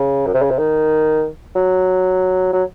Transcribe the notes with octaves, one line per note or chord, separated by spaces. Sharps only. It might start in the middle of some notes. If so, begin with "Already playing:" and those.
Already playing: C#3
F#2
C3
C#3
C3
D#3
F#3
F#3